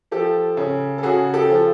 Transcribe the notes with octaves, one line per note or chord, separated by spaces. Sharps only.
F3 G4 A4
C#3
A4
C#3 F#4 G#4
G4 A4
F3